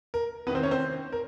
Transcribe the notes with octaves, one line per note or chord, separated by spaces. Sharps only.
A#4
E2 C3 D#3 B3 B4
C4 C5
C#4 C#5
C4 C5
A#4